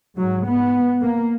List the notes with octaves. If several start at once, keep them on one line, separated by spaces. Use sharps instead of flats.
G#2 F#3
B3
A#3